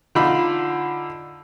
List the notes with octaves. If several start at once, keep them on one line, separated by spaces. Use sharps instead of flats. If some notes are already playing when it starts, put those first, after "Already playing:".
D3 D#4 F4 B5